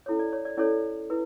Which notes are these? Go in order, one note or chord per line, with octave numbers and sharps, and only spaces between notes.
C#4 E4 A4 C#5
D5
C#5
D5
C#4 E4 A4 C#5 D5
E4 B4